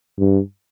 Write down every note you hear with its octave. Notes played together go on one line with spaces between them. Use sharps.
G2